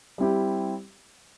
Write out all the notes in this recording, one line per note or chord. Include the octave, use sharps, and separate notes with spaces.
G3 C4 E4 G4